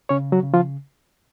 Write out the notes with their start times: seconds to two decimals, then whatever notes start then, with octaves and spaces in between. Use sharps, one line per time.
0.09 C#3 C#4 C#5
0.32 F#3 F#4
0.43 C#3
0.54 F3 F4